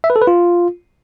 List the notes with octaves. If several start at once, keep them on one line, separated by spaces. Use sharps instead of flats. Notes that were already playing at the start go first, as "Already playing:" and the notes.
E5
B4
A4
B4
F4